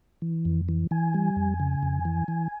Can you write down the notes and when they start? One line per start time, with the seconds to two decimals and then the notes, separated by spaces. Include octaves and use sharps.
0.22 E3
0.45 F2
0.69 E3
0.91 E3 G#5
1.14 G3
1.36 F2
1.60 C#3
1.83 F2
2.05 E3
2.28 E3